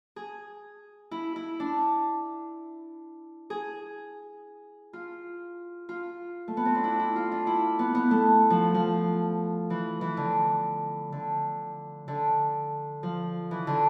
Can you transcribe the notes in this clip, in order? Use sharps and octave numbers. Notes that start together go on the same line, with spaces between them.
G#4
E4
E4
D4
G#4
F4
F4
A3
B3
C4
D4
E4
E4
F4
D4
E4
B3
B3
A3
F3
F3
E3
E3
D3
D3
D3
F3
E3
D3